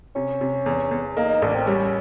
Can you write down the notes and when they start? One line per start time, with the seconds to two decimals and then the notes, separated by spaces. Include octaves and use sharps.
0.16 C3 C#4
0.41 C3
0.66 E2
0.91 E2
1.16 A#3 D#4
1.29 D#4
1.42 A1 D4
1.55 C4
1.67 G3 C#4